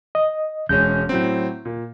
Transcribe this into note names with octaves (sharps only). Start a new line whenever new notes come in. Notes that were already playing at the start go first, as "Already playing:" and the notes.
D#5
E1 G#3 C#4 G6
A2 F#3 C4
A#2